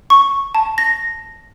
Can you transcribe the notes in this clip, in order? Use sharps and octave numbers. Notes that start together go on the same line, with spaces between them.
C#6
A5
A#6